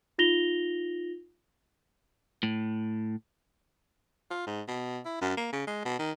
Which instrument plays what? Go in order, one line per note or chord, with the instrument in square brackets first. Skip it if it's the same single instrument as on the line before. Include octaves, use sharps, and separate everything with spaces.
[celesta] D#4 F4 A#6 F7 G7
[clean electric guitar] A2
[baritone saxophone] F4
G#2
B2
E4
F#2
A#3
C#3
G#3
B2
D#3